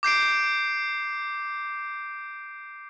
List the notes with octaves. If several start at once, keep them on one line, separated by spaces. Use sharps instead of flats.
D6 G6 C7 D7